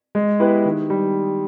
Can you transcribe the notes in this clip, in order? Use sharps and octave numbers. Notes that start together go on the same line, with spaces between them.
G#3
B3 E4 G4 B4
D#3
G3